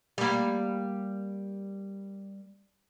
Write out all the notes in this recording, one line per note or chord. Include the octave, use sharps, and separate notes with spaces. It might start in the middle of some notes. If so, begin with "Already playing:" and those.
G3 A#3